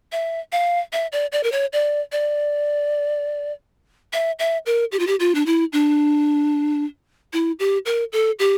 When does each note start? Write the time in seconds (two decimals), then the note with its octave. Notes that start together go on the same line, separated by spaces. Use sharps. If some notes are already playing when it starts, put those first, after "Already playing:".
0.12 E5
0.52 F5
0.93 E5
1.12 D5
1.32 D5
1.43 A#4
1.52 C#5
1.73 D5
2.12 D5
4.13 E5
4.39 E5
4.66 A#4
4.92 G4
4.99 F4
5.07 G4
5.20 F4
5.35 D4
5.46 E4
5.73 D4
7.33 E4
7.59 G4
7.86 A#4
8.12 A4
8.39 G4